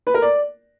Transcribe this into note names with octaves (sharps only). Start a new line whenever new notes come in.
B4
A#4
D5